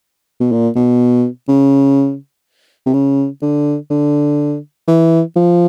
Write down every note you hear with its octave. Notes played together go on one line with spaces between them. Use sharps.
B2
A#2
B2
C#3
C3
C#3
D3
D3
E3
F3